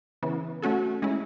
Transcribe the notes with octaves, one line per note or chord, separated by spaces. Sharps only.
C#3 E3 B3
A3 C#4 F#4 A4
G#3 C#4 E4